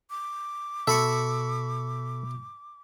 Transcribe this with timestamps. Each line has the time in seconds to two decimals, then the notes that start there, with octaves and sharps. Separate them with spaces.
0.10 D6
0.87 B2 A4 E5 B5 C#6